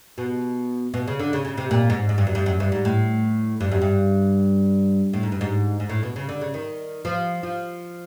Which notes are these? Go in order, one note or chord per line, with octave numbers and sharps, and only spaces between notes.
B2
B2
C#3
D3
C#3
C#3
C3
A#2
G#2
G#2
G2
F#2
G2
F#2
G2
G#2
A2
G2
F#2
G2
A2
G#2
G2
G#2
G#2
A2
B2
C#3
D3
C#3
D#3
F3
F3